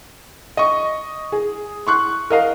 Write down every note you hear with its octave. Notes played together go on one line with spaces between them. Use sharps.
D#5 C#6
G#4
C6 C#6 F#6
A#4 D#5 F5